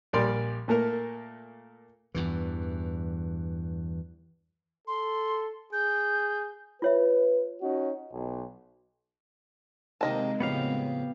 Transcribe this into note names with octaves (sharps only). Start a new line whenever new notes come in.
A#1 G3 A#4 D5 C6
A#2 A3 A#3 A#4
E2 G2 E3
A4 C6
G#4 G6
F4 B4 C#5 E5
C#4 D#4 F#4
B1
C3 D#3 G#3 A#3 C4 D#5 A5
F2 A2 C#3 B3 G4 F5